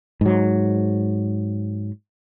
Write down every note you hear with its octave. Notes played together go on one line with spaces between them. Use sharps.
G#2 F#3